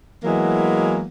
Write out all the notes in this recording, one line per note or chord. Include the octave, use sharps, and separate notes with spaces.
E3 F#3 G#3 A#3 B3 E4